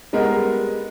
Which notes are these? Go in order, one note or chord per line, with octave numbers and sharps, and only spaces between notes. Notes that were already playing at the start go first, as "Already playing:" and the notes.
G3 G#3 B3 A#4